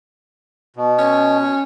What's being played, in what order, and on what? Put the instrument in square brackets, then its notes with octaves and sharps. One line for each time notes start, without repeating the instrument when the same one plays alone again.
[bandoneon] B2
[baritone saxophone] C#4